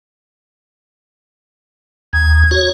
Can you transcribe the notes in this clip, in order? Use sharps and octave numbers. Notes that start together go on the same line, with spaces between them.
D#2 G#6
F#4 C#5